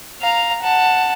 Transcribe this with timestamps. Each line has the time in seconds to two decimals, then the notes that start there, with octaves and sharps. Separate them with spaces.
0.21 F5 A#5
0.62 F#5 A5